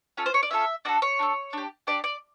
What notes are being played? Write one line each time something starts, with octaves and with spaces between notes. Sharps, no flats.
C#4 F4 A4
C5
C#5
D5
C#4 F4 A4 E5
D4 F#4 A4 D5
C#5
D4 F#4 A4
D4 G4
D4 G4 D5
D5